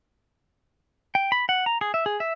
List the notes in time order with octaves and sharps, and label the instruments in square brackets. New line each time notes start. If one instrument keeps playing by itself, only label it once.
[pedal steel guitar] G5
B5
F#5
A#5
G#4
E5
G#4
E5